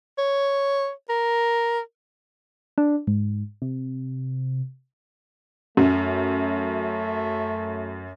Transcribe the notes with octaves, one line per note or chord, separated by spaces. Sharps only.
C#5
A#4
D4
G#2
C3
F#2 A3 C#4